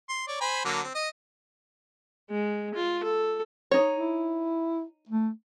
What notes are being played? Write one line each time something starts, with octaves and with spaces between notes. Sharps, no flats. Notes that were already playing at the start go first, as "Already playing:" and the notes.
C6
C#5 D5
C5 G#5 B5
D3 F#3 A#3
C4
D#5 D#6
G#3
F4
A4
D#4 C#5
E4
A3